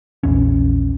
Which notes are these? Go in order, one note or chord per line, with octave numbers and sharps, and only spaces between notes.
A#1 E2 C#4